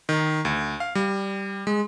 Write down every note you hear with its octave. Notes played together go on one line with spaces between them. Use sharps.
D#3
D2
F5
G3
G#3